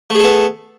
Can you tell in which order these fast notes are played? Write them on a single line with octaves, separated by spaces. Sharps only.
A3 G#4 A4 B3